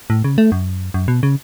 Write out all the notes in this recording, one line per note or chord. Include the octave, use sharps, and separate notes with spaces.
A2
C#3
A3
F#2
F#2
B2
C#3